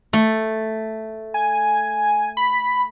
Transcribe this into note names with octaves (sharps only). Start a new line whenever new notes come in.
A3
G#5
B5